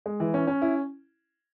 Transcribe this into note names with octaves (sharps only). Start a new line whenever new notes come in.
G#3
E3
C#4
C#4
E4